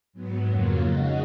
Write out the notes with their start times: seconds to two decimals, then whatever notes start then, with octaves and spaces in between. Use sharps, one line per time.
0.13 G#2 F#3 B3
0.46 F2 C#3 F#3 A#3 F4
0.79 C#3 G#3 D#4 F#4